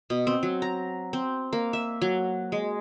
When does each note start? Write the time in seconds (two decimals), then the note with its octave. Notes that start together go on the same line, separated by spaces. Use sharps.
0.10 B2
0.27 C4
0.43 F#3
0.62 A#5
1.13 C4
1.53 A#3
1.73 E5
2.02 F#3
2.52 G#3